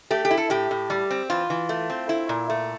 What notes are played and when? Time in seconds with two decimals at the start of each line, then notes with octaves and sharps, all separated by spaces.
0.10 A3 G4
0.25 G4
0.31 E4
0.37 A4
0.50 A2 G4
0.71 A2
0.90 G3
1.11 C4
1.30 E3 F4
1.50 E3
1.69 A3
1.90 C4
2.09 E4
2.29 A#2
2.50 A3